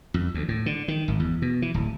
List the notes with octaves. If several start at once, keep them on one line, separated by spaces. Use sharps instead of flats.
F2
D2
A2
D3
D#3
G#1
E2
B2
E3
D1